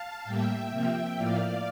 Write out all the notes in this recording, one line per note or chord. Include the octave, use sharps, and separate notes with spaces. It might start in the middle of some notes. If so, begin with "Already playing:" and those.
Already playing: F5 A5
A2 G3 A#3 E5 G5
C3 F3 A#3 E5 G5
A2 F3 A#3 D5 F5